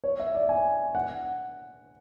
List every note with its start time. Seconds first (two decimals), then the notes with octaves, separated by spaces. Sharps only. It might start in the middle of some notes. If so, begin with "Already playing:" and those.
0.04 C#5
0.20 E5
0.35 D5
0.49 G#5
0.95 F#5